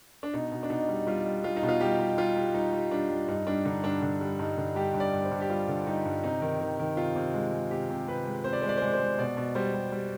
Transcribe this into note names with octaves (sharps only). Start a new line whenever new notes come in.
D4
B2 D#4
B2
D4
B2 D#4
G3
G3 F4
G3
G3 F4
D#4
B2
F4
G3 G4
G3
G3 F4
G3
G3 D#4
G3
G3 D4
G3
G2 D#4
G3 D4
D3 D#4
G2 D4
D3 D4
G3
G2 D#4
D3
G3 G4
G2
D5
G2
C5
G2
G4
G3 F4
D3
G3 D#4
G2
C3 D#4
D#3
D#3
D#3
C3 F4
C3
G#3
G#3
C3 G4
C3
C3 B4
G#3
C3 C5
D5
G#3 C5
D5
C5
G#3 D5
C5
G#3
B2 D5
B2
G3 C5
G3
G3